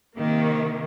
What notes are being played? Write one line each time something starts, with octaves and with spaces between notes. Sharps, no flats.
C3 D#3 A#3